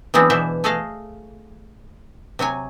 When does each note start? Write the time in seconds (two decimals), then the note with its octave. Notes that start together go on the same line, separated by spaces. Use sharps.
0.14 E3 F#3 G#3 B3 C4 D4
0.30 B2 E3 C5 D5 E5
0.64 A3 G#4 A4 D#5 F5
2.39 C3 F#3 C#5 G#5